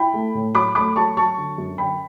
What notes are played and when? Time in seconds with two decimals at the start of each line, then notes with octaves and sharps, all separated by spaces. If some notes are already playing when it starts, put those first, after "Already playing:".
Already playing: E4 G5 B5
0.14 A3
0.35 A2
0.55 F#3 B5 D6
0.75 A3 B5 D6
0.96 F#3 A5 C#6
1.16 F#3 A5 C#6
1.38 D3
1.58 F#2
1.78 D3 G5 B5